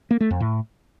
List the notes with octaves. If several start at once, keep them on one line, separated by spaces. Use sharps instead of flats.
A#3
A3
F2
A2